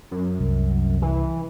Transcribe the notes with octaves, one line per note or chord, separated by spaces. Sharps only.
F#2
C2
E3